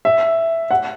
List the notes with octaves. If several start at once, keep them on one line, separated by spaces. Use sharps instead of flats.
E5
F#5